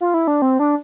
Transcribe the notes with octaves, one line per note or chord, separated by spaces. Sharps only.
F4
E4
D4
C4
D4